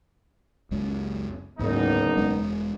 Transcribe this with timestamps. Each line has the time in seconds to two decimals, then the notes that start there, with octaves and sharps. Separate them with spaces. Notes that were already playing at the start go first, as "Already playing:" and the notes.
0.71 F#1 C#2 G#3
1.59 F#1 D2 G#2 A3 B3 D#4
2.17 E1 G#3 D4